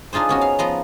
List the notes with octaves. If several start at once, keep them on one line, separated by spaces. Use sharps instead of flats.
D4 D#4 F4 G#4 C5
B3 C#4 F#4
F5
F3 B3 A#5 C6